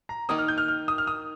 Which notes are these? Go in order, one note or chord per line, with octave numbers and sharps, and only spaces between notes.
A#5
D#3 A#3 D#4 D#6
F6
G6
F6
F6
D#6
F6
D#6